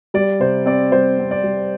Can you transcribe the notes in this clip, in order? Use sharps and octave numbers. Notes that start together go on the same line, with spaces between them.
G3 D5
C3 C5
C4 D5
G3 C5
C4
D5
G3